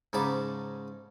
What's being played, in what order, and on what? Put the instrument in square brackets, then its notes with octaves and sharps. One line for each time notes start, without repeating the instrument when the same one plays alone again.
[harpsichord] G#2 C#3 D#4 A5 B5 D6